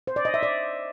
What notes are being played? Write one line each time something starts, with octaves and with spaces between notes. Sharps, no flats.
C5
D5
D#5
E5
D5